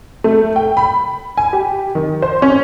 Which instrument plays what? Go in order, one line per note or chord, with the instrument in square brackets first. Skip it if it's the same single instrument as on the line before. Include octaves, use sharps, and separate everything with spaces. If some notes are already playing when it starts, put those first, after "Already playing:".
[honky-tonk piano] A3
G5
B5
G#5
G4
D#3
C5
C#4